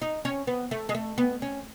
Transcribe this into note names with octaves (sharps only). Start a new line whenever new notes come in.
D#4
C#4
B3
A3
G#3
A3
B3
C#4